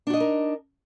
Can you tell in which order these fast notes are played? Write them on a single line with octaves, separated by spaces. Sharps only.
D4 F#4 D#5 D#4 A#4